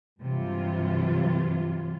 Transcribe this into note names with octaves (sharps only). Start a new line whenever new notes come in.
G2 C3 E3 F#3 F4